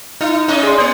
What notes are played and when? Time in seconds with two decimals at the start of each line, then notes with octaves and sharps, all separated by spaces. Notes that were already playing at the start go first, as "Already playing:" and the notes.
0.21 D#4 E4
0.48 A2 C#4 D#5
0.63 G#4 D5 C6
0.80 A#3